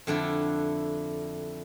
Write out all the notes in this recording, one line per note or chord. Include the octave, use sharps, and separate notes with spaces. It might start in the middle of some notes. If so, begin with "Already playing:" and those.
F2 D3 D4 E4